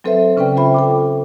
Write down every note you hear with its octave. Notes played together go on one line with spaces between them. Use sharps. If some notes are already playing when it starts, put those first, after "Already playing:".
F#3 C4 A4 B4 C5 E5
C#3 C#4 B4 D5 G5
F4 C5 E5 G5 B5
A4 G5 D6